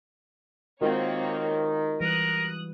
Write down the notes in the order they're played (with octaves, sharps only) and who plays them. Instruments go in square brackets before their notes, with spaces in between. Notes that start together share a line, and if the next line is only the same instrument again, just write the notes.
[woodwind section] D#3 [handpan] G#3 F4 F#4 [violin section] A#3 C4 C#5
[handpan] E3 G3 B4 [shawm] A#4 [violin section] D#6 F#6